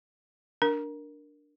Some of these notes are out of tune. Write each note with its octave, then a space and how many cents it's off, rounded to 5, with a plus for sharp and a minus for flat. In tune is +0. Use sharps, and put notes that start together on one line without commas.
D4 +0 A#4 +0